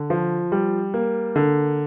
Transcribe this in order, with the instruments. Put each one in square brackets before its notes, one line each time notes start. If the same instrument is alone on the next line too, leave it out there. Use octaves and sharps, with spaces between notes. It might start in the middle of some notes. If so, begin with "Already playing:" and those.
Already playing: [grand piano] D3
F3
G3
A#3
D3